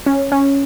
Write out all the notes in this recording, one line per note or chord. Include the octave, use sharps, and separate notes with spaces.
C#4
C#4